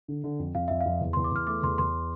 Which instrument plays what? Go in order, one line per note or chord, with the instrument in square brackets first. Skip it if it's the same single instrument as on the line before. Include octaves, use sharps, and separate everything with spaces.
[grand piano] D3
D3
F2
[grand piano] F2 [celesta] F5
[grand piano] F2 [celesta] E5
[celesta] F5
[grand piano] F2
E2
[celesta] C6
[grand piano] E2
[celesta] D6
[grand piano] E2 [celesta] F6
[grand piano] A3 [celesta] D6
[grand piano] E2 [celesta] C6
[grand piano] E2 [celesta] C6